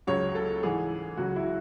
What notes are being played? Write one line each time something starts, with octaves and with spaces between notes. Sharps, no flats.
C#2 C#3 F#3 C#5
A4
G#2 E3 G#4
C#2 C#3 F#3 F#4
E4